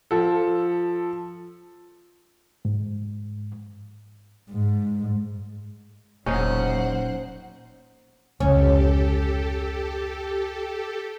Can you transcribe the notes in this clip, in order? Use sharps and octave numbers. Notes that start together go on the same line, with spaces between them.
F3 A4
G#2
G#2
E1 A#2 F#3 C#4 D#4 C5 F#5
F1 C#2 C#4 G4 A4